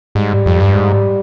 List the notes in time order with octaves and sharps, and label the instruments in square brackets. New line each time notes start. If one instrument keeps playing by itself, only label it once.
[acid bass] G#2 [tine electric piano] G3
[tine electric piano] G3
[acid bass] F2
[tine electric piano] G3
[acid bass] G2
[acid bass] G#2 [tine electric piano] G3
[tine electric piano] G3